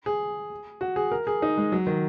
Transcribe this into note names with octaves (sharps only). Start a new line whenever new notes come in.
G#4
F#4
G#4
A#4
G#4
D#4
G#3
F#3
D#3